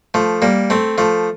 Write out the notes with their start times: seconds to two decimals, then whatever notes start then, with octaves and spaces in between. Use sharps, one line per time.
0.14 F3 A3
0.42 G3 A#3
0.70 A3 C4
0.98 F3 A3